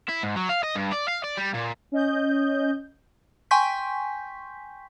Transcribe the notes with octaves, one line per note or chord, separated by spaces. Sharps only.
E4
G#2
F#3
F5
D#5
G2
D5
F5
D5
G3
A#2
C#4 D#5 G6
G5 G#5 C6 C#6 G6 B6